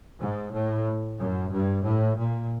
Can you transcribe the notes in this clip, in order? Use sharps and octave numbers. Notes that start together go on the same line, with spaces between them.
G#2
A2
F#2
G2
A2
A#2